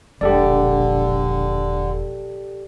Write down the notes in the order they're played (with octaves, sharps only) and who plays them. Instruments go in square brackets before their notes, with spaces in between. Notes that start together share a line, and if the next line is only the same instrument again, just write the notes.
[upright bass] E1 [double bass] A#1 [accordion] D3 [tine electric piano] G4 A4 D5